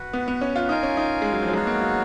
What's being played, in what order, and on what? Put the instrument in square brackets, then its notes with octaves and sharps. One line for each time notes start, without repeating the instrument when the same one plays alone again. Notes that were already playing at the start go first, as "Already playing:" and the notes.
Already playing: [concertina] F#4 B4 F#5
[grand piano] B3
B3
C#4
F4
[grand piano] D#4 [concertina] F4 A#4 F5 G#5
[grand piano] C#4
D#4
G#3
F#3
F3
F#3
[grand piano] G#3 [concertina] B3 D#4 F#4 C#5 F5
[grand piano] A#3
F#3